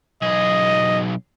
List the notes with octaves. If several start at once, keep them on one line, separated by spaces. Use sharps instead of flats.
B1 G#4 D#5